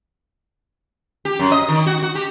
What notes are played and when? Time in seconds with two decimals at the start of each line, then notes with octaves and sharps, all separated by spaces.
1.25 G4
1.39 F#2
1.52 D#5
1.68 D#3
1.86 F#4
2.03 F#4
2.15 G4